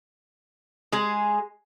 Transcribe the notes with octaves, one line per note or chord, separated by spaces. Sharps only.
G#3 G#4